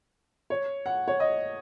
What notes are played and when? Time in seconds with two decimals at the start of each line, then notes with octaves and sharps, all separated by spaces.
0.50 C#5
0.86 F#5
1.08 C#5
1.20 D#5